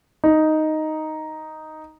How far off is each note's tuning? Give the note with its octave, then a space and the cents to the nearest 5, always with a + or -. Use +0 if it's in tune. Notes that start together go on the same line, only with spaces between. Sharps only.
D#4 +0